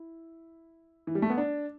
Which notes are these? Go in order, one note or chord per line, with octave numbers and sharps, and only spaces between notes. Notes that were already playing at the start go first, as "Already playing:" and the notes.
Already playing: E4
E3
G3
A3
B3
D4